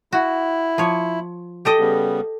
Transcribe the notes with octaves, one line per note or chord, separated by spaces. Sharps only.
E4 F#4
F3 C#5
G4 A4 D#5
C#3 G3 B3